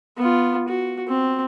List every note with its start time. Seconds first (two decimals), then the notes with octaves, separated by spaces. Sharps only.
0.18 B3 F4
0.68 F#4
1.08 C4